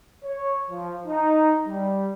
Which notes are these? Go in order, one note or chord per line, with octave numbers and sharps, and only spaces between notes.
C#5
F3
D#4
G3